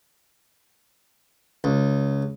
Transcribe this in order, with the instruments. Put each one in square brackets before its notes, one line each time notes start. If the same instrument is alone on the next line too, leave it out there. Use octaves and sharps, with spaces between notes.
[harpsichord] C#2